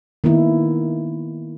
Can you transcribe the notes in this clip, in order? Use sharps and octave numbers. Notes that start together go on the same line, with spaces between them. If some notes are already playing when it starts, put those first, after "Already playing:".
D#3 A#3 B3 D#4 E4